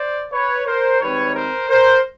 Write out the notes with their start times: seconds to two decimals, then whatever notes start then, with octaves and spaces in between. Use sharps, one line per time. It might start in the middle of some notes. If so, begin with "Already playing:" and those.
Already playing: C5 D5
0.32 B4 C#5
0.66 A#4 C5
1.01 G#2 D#3 G3 C4 B4 C#5
1.35 A#4 C5
1.69 A#4 C5